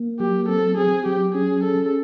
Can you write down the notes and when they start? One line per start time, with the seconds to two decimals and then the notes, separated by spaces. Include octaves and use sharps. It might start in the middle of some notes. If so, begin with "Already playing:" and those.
Already playing: A#3
0.19 F#3 G4
0.49 C4 A4
0.77 C4 G#4
1.05 F#3 G4
1.35 C#4 G#4
1.63 G#4 A4